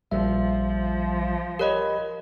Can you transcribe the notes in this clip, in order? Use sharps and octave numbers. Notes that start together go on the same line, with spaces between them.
A#1 F3 G3 E5
G4 A#4 C#5 D#5 B5